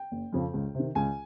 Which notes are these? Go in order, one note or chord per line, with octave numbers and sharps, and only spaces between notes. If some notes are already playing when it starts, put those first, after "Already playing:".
Already playing: G5
F#1
F2 C#3 F3
C#2
C3 D#3
C#2 G#5